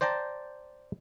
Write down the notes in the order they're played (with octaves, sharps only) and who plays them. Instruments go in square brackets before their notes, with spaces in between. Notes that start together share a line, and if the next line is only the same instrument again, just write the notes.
[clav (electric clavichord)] C5 D5 G5 A5 A#5